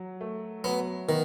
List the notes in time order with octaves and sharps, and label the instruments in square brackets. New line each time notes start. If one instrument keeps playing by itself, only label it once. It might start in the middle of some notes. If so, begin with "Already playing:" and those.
Already playing: [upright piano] F#3
A3
[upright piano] F#3 [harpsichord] B3
[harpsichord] D#3 [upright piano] B3